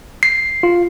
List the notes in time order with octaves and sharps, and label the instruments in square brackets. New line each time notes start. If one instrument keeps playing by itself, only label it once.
[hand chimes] C7
[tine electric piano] F4